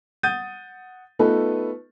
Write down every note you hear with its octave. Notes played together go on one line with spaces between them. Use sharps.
F#5 D#6 G6 A6 D#7
A3 B3 D#4 F4 A4 B4